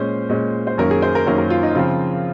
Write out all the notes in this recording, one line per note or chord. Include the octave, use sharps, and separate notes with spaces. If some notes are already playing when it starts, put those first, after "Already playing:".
Already playing: A#2 G#3 C#4 C5
A#2 G#3 C#4
C5
F#2 D#3 A#3 C#4 A#4
G#4
C5
A#4
F#2 D#3 A#3 C#4 A#4
A#4
F4
D#4
C#3 F3 C4 F4